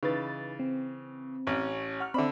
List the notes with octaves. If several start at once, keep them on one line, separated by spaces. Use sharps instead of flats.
C#3 E3 D#4 B4 A6
C4
A1 C#4
F#5 C#6 F6
D3 C4 D5 E5 B5